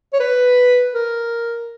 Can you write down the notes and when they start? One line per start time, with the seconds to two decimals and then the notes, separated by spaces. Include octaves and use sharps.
0.13 C#5
0.20 B4
0.94 A#4